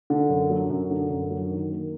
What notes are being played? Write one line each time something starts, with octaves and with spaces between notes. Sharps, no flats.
D3
F#2
F#3
F#2
D3
F#2
F#3
D#3
A#3